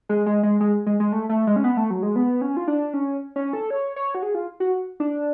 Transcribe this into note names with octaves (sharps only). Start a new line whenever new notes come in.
G#3
G#3
G#3
G#3
G#3
G#3
A3
A3
G#3
C#4
B3
A3
F#3
G#3
B3
C#4
F4
D4
C#4
C#4
A4
C#5
C#5
F#4
G#4
F4
F#4
D4